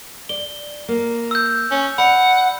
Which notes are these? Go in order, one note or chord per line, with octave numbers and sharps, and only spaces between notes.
D5 G7
A#3
E6 G6
C#4
D5 F#5 B5 C#7